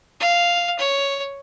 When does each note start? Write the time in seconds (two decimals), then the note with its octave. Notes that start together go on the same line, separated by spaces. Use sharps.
0.20 F5
0.79 C#5